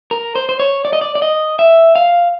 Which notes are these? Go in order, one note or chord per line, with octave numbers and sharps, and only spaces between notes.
A#4
C5
C5
C#5
D5
D#5
D5
D5
D#5
E5
F5